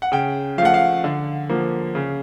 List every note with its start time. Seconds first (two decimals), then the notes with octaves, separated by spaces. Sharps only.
0.02 F#5
0.12 C#3 G5
0.58 F3 F5
0.62 A3 F#5
0.74 F5
1.04 D3
1.49 F3 A#3
1.95 C#3